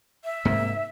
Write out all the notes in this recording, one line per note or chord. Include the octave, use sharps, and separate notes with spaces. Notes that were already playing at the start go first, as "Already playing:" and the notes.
E5
G#2 C3 A#3